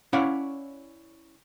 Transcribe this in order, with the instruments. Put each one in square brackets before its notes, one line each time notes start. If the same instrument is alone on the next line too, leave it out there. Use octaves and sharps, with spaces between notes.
[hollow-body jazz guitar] C#4 E4 C#5 D5 F5 F#5